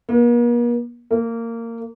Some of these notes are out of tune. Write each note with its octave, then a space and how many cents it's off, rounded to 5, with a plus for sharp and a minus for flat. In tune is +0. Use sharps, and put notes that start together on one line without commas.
A#3 +45
A#3 -20